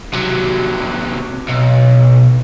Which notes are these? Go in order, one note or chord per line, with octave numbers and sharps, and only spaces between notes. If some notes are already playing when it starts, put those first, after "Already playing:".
C3 F#3
B1